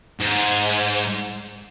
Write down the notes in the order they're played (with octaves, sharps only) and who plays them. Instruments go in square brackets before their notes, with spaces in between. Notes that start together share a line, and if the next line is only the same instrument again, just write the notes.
[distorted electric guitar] G#2